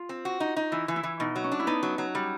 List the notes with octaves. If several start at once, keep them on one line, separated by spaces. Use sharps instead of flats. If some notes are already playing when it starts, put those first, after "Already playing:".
Already playing: F4
C4
F#4
D#4
D#4
E3 E4
E3
E4
E3
B2 D#4
F#3
C#4
D4
E4
B3 D#4
F#3
F#3
G3